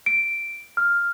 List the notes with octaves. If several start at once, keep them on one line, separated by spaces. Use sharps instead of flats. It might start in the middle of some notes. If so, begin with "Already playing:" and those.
D7
F6